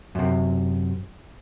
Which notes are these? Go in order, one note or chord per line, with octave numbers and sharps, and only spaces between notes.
F#2 C3